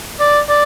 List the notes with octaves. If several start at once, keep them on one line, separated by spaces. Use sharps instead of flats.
D5
D5